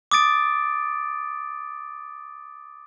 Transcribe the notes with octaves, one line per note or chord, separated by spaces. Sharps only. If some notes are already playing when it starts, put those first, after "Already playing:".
D6 D#6 A6 D7